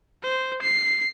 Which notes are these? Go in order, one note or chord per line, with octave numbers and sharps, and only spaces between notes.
C5
C7